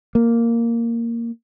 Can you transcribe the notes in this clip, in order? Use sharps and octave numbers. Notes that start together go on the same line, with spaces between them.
A#3